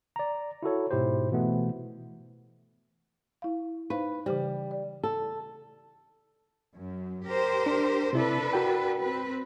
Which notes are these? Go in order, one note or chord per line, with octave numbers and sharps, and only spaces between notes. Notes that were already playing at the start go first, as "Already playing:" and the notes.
D5 A#5
E4 F#4 A4 C#5
G#2 B2 E4 G4 C5
B2 E3 A3 B3
E4 F5
D#4 B4 C5 F5
C#3 E3 G3 C5
D5
A4
F#2
G4 A#4 C5
D4
C3 D4 E4 A4 B4 D5
F#4 A#4 G5
C4 B4